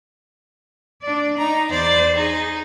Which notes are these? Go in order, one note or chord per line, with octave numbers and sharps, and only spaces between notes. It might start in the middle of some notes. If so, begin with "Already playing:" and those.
D4 D5
D#4 A#5
E2 C5 D5
D#4 G#4